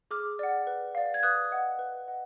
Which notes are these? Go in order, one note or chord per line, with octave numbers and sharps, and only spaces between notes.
G#4 D6 F6
D5 F#5
B4
D5 F5
G#6
B4 D#6 F#6
D#5 F#5
B4
D#5 F#5